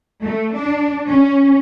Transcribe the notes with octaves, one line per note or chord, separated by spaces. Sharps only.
A3
D4
C#4